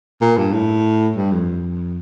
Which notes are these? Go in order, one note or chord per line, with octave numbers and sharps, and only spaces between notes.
A#2
G2
A2
G2
F2